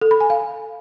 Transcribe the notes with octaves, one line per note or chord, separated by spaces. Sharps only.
A4
B5
G#5
F5